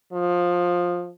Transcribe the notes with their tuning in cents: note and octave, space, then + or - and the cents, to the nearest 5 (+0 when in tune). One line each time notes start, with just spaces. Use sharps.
F3 +15